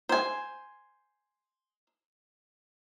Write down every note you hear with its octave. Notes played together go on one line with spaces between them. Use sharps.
C5 G#5